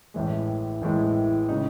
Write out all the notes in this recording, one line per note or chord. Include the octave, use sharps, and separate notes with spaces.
A1 A2 E3 G#3
A1 A2 E3 G#3
C#3 G#3 D#4